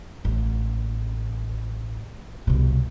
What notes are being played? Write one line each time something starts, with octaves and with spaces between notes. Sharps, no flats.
A1
C2 B2